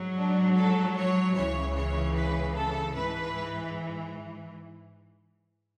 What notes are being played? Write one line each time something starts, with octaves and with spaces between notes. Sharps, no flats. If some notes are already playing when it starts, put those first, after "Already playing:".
Already playing: G#2 F#3
D4
A4
C#5
C#2 C#3 E3 C#5
C#5
B4
A4
G#2 E3 B4